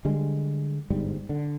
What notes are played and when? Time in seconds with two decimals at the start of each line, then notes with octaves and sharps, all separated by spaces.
0.05 D3 G3 G#3
0.90 G1 G#2 G3
1.29 D3